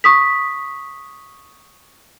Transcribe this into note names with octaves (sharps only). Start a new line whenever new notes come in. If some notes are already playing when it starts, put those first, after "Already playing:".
C#6 D#6 B6